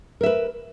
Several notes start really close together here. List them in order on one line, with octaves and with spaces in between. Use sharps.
A#4 E5 B4